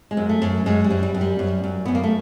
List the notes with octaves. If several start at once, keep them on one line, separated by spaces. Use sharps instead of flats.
G#3
F#2
A3
F#2
F#2 G#3
G3
F#2
G3
F#2
G3
F#2
F#2
F#2 B3
A#3
A3